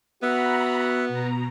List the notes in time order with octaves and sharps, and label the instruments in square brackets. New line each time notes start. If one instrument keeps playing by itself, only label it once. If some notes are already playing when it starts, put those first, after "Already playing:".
[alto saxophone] B3 [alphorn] F#4 [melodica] E5 F#5 [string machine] A#5 B5
[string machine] B2 A#5